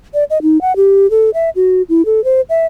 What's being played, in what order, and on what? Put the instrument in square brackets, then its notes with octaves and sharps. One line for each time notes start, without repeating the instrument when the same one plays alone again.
[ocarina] D5
D#5
D#4
F#5
G4
A4
E5
F#4
E4
A4
C5
E5